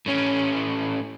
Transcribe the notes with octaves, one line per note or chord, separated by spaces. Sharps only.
A2 C#4